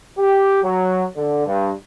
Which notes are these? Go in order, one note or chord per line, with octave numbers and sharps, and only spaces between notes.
G4
F#3
D3
G2